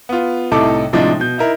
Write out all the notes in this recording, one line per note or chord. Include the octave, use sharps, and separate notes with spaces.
B3 F4
C2 A2 C3 D#4 A4 D6
A2 C3 F3 G#3 D4 D#4
B2 G6
D#4 E4 A#4